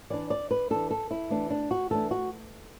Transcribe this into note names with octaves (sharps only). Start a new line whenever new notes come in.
E3 D4 D5
D5
B4
E3 D4 A4
A4
E4
E3 A3 D4
D4
F#4
E3 A3 D4 A4
F#4